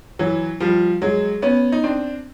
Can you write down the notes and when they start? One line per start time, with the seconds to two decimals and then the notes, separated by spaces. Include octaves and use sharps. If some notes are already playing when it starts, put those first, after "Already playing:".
0.19 E3 F#3
0.60 F3 G3
1.02 F#3 G#3
1.42 B3 C#4
1.72 D#4
1.84 C4 D4